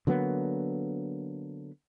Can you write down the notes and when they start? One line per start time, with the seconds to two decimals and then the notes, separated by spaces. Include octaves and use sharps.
0.07 D3 F#3 A#3 B3